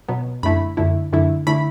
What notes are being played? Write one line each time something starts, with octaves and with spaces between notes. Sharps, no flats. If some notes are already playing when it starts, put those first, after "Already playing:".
B2 F#3 B3
F#2 D3 A3 E4 B5
F#2 D3 A3 E4
F#2 D3 A3 E4
D3 A3 E4 B5